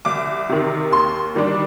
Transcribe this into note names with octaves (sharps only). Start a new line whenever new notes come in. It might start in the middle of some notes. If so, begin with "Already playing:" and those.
C2 D6
C3 D#3
D#2 C6
D#3 G3 D4